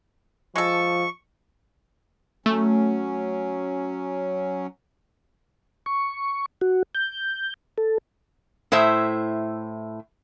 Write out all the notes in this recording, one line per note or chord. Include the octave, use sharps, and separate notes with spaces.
F3 G#3 A4 C#6
F#3 A3 C#4
C#6
F#4
G6
A4
A2 E4 C5 E5